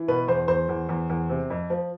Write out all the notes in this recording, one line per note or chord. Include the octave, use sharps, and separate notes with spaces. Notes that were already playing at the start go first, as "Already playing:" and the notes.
Already playing: E3
B2 B4
E2 C5
E2 C5
E2
E2
E2
C3
F2
F3